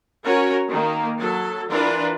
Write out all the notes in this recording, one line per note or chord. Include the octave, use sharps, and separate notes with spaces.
C#4 F#4 A#4 C#5
D#3 A#3
F#3 A4
E3 D4 F4 A#4 B4